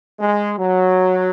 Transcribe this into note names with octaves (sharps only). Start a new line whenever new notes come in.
G#3
F#3